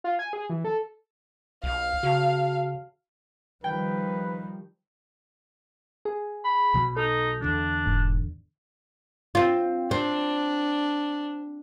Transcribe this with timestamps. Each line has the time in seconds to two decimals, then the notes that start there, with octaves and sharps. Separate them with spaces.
0.04 F4
0.19 G#5
0.33 G#4
0.50 E3
0.65 A4
1.64 B1 F5
2.03 C#3 F#4 A5
3.64 D#3 F3 G3 B4 G5
6.05 G#4
6.45 B5
6.74 B1 B2 F#3
6.97 D#4 A4
7.42 E2 D3 D4
7.86 E1 G#2
9.35 C4 F4
9.91 C4 D4